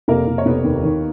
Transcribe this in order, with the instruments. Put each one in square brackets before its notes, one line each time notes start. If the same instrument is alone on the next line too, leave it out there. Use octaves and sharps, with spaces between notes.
[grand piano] F1 [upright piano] A#3 A#4
[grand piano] F1
[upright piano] C#5
[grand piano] F1 [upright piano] B3 B4
[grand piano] D#2
D#3